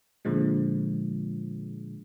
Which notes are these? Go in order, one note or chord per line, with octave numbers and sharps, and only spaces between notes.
A#2 D3 F3 G#3